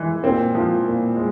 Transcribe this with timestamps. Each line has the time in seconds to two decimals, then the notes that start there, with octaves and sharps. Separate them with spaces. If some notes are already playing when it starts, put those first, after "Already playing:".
Already playing: E3 G#3
0.23 A#2 C4 C5
0.55 F3
0.85 A#2
1.16 G#3